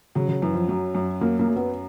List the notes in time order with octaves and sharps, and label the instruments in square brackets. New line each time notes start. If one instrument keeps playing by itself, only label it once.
[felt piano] C#3 [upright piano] F#3
[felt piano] C#3
[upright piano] F#2 [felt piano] E3
[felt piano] F3
[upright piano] F#2 [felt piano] F#3
[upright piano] F#2
[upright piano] F#3 [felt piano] A#3
[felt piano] A#3
[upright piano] F#2
[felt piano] B3